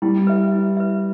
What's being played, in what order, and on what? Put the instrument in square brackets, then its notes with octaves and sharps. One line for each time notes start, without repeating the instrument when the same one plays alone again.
[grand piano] G3 [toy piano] E4
[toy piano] B4 E5
E4
B4 E5